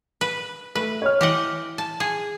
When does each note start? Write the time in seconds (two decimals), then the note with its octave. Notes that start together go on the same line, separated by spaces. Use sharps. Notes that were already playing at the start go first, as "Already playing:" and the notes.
0.21 B4
0.75 A3 B4
1.02 C#5 F6
1.21 E3 G4 D#5 F#5 G7
1.78 A5
2.00 G#4